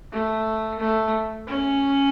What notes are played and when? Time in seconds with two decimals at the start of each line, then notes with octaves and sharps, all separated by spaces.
0.12 A3
0.79 A3
1.47 C#4